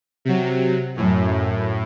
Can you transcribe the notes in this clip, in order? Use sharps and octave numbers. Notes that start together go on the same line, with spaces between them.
C3 F#3
F#2 A2